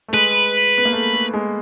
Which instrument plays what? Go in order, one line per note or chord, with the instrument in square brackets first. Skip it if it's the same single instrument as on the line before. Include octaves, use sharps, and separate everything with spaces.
[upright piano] A3
[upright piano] G#3 [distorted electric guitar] B4
[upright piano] B3
A#3
A3
A3
G#3